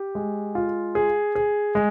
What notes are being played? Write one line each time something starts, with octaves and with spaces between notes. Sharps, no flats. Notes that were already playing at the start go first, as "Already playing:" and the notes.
Already playing: G4
G#3
F4
G#4
G#4
G#3